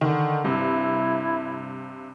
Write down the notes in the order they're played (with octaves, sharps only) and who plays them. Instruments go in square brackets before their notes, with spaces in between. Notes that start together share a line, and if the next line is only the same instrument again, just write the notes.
[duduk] D3 [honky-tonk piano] D#3
[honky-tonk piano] G2 C3 [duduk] E4